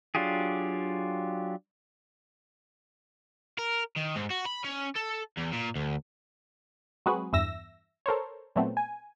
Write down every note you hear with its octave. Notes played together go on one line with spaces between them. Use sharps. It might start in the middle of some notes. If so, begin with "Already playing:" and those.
F#3 D4 F4 G4 G#4
A#4
D#3
G#2
F#4
B5
C#4
A4
E2
A#2
D2
F#3 G#3 C4 F#4 G#4 B4
E2 G2 E5 E6 A#6
A4 A#4 C5 C#5
A#2 F#3 A3 B3 C4
G#5